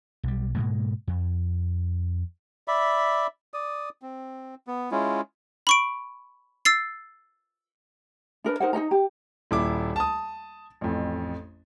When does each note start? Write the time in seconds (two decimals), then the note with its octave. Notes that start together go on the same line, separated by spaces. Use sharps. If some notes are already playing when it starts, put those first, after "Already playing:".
0.23 B1 G3
0.55 G#2 B2 G#3 A#3
1.08 F2
2.68 D5 E5 B5
3.54 D5 D#6
4.02 C4
4.67 B3
4.92 G#3 C#4 E4 F4
5.67 B5 C#6 D7
6.65 E6 A6 C7
8.44 D4 A#4 B4
8.60 D#4 A#4 C5 F#5
8.73 D#4 A4 D#5 A#5
8.91 G4
9.51 D#1 E4 D6
9.96 A5 D#6
10.81 A1 F2